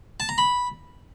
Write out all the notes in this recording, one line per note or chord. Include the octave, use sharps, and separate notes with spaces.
A5
A#5
B5